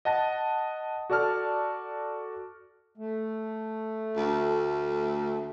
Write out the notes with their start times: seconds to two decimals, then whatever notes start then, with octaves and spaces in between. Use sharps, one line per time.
0.05 D#5 F#5 A5 A#6
1.10 F#4 A4 D5 A5 F6
2.98 A3
4.16 D2